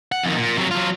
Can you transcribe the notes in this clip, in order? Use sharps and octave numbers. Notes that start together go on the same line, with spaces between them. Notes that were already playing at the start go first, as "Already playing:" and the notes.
F#5
F2 D#3
A#2
C3 F#3
F#3 F4